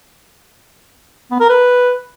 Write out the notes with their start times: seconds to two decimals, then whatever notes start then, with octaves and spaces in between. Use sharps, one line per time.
1.31 B3
1.40 A#4
1.49 B4